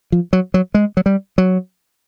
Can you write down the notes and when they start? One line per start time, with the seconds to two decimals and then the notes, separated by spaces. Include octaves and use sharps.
0.12 F3
0.33 F#3
0.54 F#3
0.74 G#3
0.97 F#3
1.06 G3
1.38 F#3